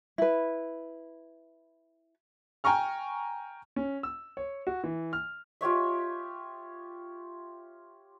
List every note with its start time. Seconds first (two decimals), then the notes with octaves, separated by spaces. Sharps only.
0.18 E4 B4
2.64 G5 G#5 A#5 C#6 F6
3.76 C#4
4.03 E6
4.37 C#5
4.67 F#4
4.84 E3
5.13 F6
5.61 F4 G4 C#5 E5